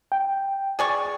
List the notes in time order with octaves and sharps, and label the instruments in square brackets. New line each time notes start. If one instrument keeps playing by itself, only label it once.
[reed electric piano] G5
[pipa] G#4 D5 C#6